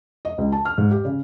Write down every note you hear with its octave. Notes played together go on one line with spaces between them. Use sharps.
D#5
C#2
A5
F6
G#2
G4
C#3